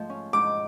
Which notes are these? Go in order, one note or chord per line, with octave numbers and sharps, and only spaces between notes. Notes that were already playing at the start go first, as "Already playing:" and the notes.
Already playing: G#2 F3 A3
C#4
G#2 D6